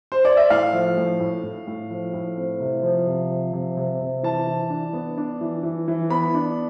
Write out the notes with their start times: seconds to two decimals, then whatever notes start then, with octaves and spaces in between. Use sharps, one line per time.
0.12 C5
0.25 D5
0.37 E5
0.50 A2 F5
0.73 F3
0.97 A2
1.20 A2
1.43 A2
1.67 A2
1.90 F3
2.13 A2
2.37 C4
2.60 C3
2.83 F3
3.07 C3
3.31 F3
3.53 C3
3.77 C3
4.00 C3
4.23 E3 A5
4.47 E3
4.70 D4
4.93 B3
5.18 D4
5.41 E3
5.63 E3
5.88 E3
6.10 B3 B5
6.35 D4